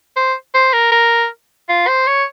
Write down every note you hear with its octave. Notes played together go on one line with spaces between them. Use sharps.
C5
C5
A#4
A#4
F4
C5
C#5